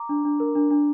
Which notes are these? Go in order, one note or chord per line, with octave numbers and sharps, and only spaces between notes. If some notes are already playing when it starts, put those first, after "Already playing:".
Already playing: A#5 D6
D4
D4
A#4
D4
D4